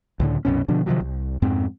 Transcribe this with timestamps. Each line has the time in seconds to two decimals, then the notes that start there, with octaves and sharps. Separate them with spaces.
0.20 C#2 A2 D3
0.45 C2 F#2 B2 C#4
0.68 B2 D3 F3 D4
0.86 C3 D#3 F3 F#3
1.00 C2
1.42 F2 G#2 C4